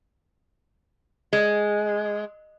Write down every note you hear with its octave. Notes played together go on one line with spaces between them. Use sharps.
G#3